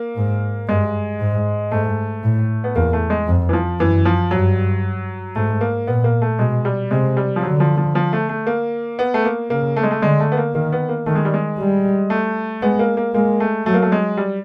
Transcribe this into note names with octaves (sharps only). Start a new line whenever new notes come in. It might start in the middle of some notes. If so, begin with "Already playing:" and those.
Already playing: A#3
G#2
G2 G#3
G#2
G#2 A3
A2
B3
E2 A#3
A3
G#3
F2
E3
F3
F#2 E3
F3
G2 F#3
G#2 A3
A#3
A#2 B3
A#3
A3
B2 G#3
G3
C3 G#3
G3
F3
D3 F#3
F3
F3
F3
A3
A3
A#3
B3
A3
A#3
C#3 A#3
A3
G#3
A3
D3 G#3
A3
B3
A#3
D#3 A#3
B3
A#3
D#3 A3
G#3
G3
G#3
G3
A3
G#3 B3
A#3
A#3
G#3 A#3
A3
F#3 A3
A#3
A3
G#3
G3